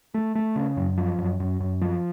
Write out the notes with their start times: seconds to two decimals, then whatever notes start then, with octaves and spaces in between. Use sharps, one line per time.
0.14 A3
0.35 A3
0.56 C#3
0.77 F#2
0.97 F3
1.18 F#2
1.40 F#2
1.60 F#2
1.81 F3